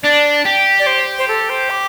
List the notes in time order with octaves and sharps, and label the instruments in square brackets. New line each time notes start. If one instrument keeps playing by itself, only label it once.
[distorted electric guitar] D4 [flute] D5
[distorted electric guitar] G4
[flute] D5
C5
C5
A4
C5
D6